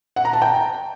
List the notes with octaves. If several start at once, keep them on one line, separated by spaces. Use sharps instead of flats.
F#5
A#5
A5
G5